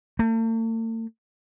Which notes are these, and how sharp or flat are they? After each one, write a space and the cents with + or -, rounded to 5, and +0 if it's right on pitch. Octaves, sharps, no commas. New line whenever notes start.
A3 +45